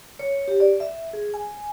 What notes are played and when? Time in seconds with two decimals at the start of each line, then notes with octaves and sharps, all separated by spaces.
0.19 C#5
0.48 G4
0.60 D5
0.80 E5
1.13 G#4
1.34 G#5